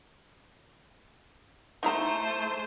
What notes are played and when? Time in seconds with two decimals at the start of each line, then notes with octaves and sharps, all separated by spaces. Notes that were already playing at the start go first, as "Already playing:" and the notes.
1.83 A3 D#4 E4 C5 A#5